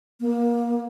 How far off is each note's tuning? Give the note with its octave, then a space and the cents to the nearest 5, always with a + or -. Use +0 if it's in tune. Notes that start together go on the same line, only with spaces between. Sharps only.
A#3 +25